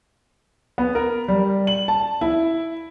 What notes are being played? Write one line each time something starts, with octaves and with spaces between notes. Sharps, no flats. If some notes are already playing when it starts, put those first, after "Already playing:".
B3
A#4
G3
F#7
A5
E4